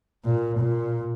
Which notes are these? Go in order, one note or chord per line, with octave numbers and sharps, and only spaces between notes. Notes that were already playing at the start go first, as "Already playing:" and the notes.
A#2
A#2